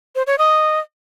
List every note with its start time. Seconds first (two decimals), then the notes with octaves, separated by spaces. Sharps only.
0.15 C5
0.27 C#5
0.39 D#5